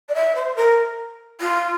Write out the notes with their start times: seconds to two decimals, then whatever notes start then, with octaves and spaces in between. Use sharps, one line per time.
0.09 D5
0.14 E5
0.36 C5
0.56 A#4
1.41 F4